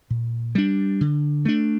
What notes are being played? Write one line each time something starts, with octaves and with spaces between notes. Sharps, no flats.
A#2
G3 D4
D3
A3 D4